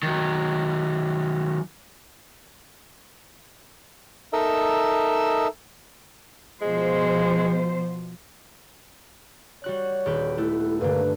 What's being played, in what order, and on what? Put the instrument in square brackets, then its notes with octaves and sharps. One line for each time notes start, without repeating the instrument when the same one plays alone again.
[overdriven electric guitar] D#3 F#3
[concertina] D#4 A4 A#4 D#5 E5 E6
[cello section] B2 F3 C5 [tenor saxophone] G#3
[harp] G3 F#4 F#6 [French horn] C#5
[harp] D#1 G4 B4
[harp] A3 B3 [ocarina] E4
[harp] G2 D3 [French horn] A#3 [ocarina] B4